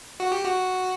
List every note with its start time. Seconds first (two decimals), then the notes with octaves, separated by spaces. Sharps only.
0.20 F#4
0.32 G4
0.44 F#4